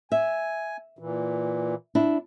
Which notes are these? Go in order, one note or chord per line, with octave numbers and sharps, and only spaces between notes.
E5 G#5
A#2 E3
D4 E4